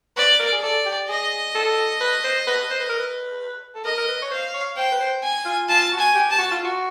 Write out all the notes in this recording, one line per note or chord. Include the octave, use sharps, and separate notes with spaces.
B4 D5
A#4
G#4
A4 D5
G4
G#4 D#5
A4
B4
C5
B4
C5
B4
A#4
B4
A4
A#4 D#5
A#4
B4
C#5
C5 F5
C#5
C5 G5
B4
C5
G#5
F4
F4 A5
F#4
G#5
G4
A5
F#4
F4
F#4